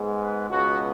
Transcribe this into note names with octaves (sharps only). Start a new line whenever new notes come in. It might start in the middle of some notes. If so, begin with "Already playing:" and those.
Already playing: G#2 G#3 B3
B4
C#2 B2 B3 F#4